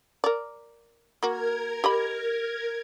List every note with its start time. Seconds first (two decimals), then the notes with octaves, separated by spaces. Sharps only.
0.24 A#4 D5
1.23 A#3 F#4 A#4 G#6
1.84 G4 D#5 B5